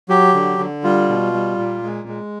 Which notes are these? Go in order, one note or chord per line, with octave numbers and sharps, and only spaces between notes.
F#3 G4
D3
D3
G3 F4
B2
G3
A#2
G#3
G#3